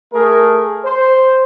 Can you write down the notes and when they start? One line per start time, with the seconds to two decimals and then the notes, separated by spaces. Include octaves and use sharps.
0.13 A3 G#4 A#4
0.84 C5